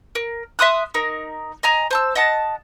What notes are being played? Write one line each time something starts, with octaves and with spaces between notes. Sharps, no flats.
A#4
E5 C6 D#6 F#6
D#4 A#4
D#5 G#5 A#5
C5 A5 E6
D#5 F#5 A5